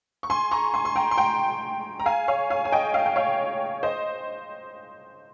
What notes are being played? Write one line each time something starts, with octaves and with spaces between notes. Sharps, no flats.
C#6
G#5 C6
A#5 C#6
G#5 C6
C6
G5 A#5
C6
G5 A#5
A#5
F5 G#5
C#5 F5
F5 G#5
G#5
D#5 G5
F5
G5
C#5 F5
C5 D#5